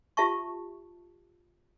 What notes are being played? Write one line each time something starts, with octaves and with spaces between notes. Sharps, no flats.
F4 G4 E5 A5 C#6